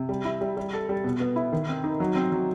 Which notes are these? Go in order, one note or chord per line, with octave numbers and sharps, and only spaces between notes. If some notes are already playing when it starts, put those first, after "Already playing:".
Already playing: C3
G3
E4
G3
G3
A4
G3
B2
B3
E4
D#3
C4
D#4
F#3
C4
F#3